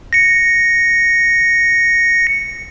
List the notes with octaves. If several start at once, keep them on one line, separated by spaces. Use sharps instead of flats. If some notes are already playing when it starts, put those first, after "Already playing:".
A#6 C#7